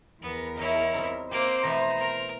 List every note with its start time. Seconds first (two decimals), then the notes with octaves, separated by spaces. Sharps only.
0.22 E2 B3 A#4
0.57 D#4 E4 C#5 D#5 E5
0.94 G3 C4 D#4
1.31 A#3 C4 G4 C5 D6
1.63 B2 E3 A3 B3 A#5
1.98 A#4